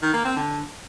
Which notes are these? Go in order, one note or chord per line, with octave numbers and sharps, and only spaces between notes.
D#3
A#3
C4
D3